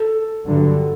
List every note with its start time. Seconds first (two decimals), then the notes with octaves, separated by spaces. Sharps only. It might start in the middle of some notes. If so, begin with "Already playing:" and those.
Already playing: A4
0.44 G2 D3 F#3